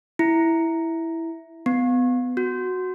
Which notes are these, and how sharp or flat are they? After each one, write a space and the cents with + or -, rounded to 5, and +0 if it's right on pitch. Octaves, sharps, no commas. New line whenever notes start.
E4 -5
B3 +25
F#4 -5